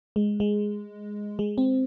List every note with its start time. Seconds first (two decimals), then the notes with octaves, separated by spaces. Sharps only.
0.16 G#3
0.40 G#3
1.39 G#3
1.58 C4